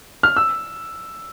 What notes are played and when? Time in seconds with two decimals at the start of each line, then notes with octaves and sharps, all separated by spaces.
0.23 F6
0.36 E6